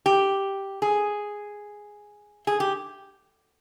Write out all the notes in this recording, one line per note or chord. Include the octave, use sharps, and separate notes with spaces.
G4
G#4
G#4
G4